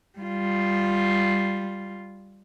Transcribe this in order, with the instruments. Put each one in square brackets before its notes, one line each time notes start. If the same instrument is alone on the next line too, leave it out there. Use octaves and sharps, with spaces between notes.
[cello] G3 F4